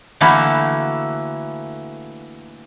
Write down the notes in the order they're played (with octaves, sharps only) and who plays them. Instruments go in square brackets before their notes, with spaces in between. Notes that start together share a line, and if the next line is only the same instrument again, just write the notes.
[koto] D3 E3 A3 A#3 E4 F#4